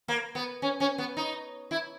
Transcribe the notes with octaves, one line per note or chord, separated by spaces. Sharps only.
A#3
B3
C#4
C#4
B3
D#4
E4